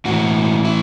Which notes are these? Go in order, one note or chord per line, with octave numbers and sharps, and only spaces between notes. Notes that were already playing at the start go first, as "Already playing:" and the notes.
A2 E3 F#4
E4